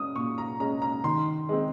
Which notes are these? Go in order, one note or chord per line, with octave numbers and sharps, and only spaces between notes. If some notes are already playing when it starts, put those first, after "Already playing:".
Already playing: G#3 C#4 D#6
A#2 C#6
A#5
G#3 C#4 A#5
A#5
D#3 C6
G#3 C4